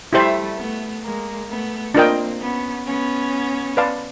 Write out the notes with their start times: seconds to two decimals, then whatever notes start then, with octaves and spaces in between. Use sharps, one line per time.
0.13 G3 A3 E4 G4 C5 E5
0.58 A3 B3
1.04 G#3 A#3
1.49 A3 B3
1.95 A#3 C4 D4 F4 A#4 D#5 G5
2.40 B3 C#4
2.86 B3 C#4
3.77 B4 D5 F5 A5